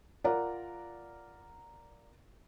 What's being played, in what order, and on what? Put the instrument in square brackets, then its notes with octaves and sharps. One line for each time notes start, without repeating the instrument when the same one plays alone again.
[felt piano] F4 A#4 D5 F#5 A#5